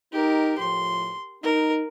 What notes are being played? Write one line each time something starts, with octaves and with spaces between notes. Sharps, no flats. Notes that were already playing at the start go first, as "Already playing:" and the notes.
D#4 G4 A#4
A2 F3 C6
D#4 A#4